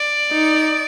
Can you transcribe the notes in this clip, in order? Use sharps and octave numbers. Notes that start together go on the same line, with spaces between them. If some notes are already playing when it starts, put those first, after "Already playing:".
Already playing: D5
D#4